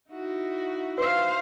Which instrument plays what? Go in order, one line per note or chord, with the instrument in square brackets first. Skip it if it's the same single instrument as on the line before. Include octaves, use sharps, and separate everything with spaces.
[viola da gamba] D#4 E4 F#4
[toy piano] B4 [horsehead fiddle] C5 F5